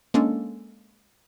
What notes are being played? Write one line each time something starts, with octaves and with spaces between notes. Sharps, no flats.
G#3 A#3 C#4 D4 A4